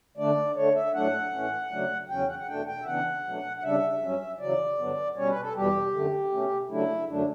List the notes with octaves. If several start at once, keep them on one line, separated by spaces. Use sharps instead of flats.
D3 A3 D4 D5
D3 A3 D4 C#5
E5
A2 F#3 A3 D4 F#5
A2 E3 A3 C#4
C#3 F#3 A3 D4
E2 C#3 F#3 C#4 G5
F#5
F#5
E2 B2 A3 D4 G5
G5
E5
C#3 E3 B3 D4 F#5
B2 F#3 A3 D4
F#5
C#3 G3 D4 E5
G2 F#3 C#4
E2 C#3 F#3 D5
G2 D3 F#3 B3 D4
B2 G3 C#4 C#5
B4
A4
E2 B2 G3 G4
F#2 D3 A3
B2 A3 C#4
C#3 F#3 A3 D4 E4
F#2 D3 F#3 A3 D4